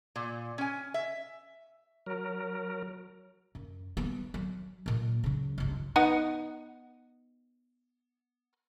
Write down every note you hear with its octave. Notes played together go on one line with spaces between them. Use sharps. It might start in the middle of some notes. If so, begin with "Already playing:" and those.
A#2
C#4 G#5
E5
F#3 A#4
F#2
G3 B3
F#3
A#2 A#3
C#3 F#3
G1 C#2
B3 D#4 F#5